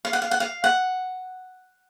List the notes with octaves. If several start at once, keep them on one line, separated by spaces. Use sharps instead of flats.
F5
F#5
F5
F#5
F5
F#5